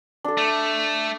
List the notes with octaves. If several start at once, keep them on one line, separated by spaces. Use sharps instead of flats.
D4 A4
A3